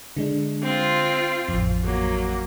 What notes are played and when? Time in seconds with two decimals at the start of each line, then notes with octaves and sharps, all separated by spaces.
0.17 D3 G#3 D4
0.63 C4 F4
1.49 A1 F2
1.84 F#3 A#3